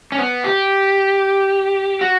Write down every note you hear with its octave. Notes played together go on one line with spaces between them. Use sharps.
C#4
B3
G4
F#4